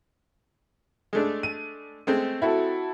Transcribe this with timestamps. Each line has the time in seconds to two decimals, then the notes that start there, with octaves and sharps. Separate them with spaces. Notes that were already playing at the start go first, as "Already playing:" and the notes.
1.13 G#3 A3 D4
1.43 D#7
2.07 G#3 A3 C4
2.42 E4 F#4 A4